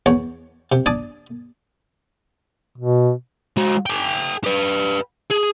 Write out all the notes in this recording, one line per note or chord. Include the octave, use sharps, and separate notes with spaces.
E2 C#5
C3
D4 G#5 A5 D#6
B2
G#3 F#4
G#4 G5
G4 B4
G#4